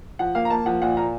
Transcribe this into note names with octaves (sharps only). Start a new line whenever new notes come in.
F3 F#5
A#3 F5
A#5
A#3 A5
F3 F#5
A#2 F#5
A#2 A#5